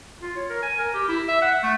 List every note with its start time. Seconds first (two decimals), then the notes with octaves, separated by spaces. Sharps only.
0.22 F4
0.36 C#5
0.50 A#4
0.63 G#5
0.79 A#4
0.94 G4
1.09 E4
1.28 E5
1.42 F#5
1.63 A3